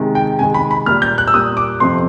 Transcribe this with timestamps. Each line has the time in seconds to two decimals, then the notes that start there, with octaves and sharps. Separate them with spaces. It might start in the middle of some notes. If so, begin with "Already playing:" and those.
Already playing: C3 D#3 G#3
0.15 G5
0.39 C3 D#3 G#3 G#5
0.54 B5
0.71 B5
0.86 A#2 G3 A#3 F6
1.02 G6
1.18 F#6
1.28 E6
1.33 A#2 G3 A#3 D#6
1.57 D6
1.80 F2 C3 F3 A3 C4 C6